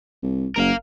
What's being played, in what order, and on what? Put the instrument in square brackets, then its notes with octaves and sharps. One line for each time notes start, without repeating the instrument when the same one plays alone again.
[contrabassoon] C2
[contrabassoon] F#1 [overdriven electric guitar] A#4 F5